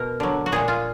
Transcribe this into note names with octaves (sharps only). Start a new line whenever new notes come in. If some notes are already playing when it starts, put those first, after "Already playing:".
Already playing: B2 A#4
D3 F#3
F#4
A#2 G#3 G#4
F4